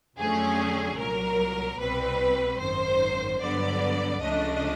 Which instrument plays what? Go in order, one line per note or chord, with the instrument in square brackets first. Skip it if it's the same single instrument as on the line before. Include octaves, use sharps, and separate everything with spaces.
[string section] F2 D3 F#3 A3 C#4 G#4
C2 A#2 F#3 A#4
C2 B2 G3 C4 B4
G#1 F#2 D#3 C5
G2 D3 F#3 B3 D5
C#2 C#3 F3 A3 D4 D#5